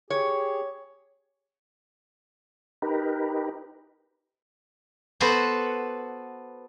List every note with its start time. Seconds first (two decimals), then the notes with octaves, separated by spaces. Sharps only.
0.10 G4 G#4 C#5
2.82 D#4 G4 A#4 B4
5.20 B3 F#4 A4 B4 C5 F#5